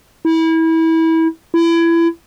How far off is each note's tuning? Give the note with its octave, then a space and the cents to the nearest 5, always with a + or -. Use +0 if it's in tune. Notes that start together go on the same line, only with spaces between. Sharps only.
E4 -25
E4 +25